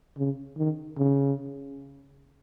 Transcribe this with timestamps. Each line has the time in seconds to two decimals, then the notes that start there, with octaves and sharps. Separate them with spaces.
0.18 C#3
0.57 D#3
0.98 C#3